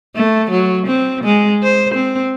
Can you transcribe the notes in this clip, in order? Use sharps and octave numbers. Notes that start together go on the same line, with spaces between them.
A3
F#3
C4
G#3
C5
C4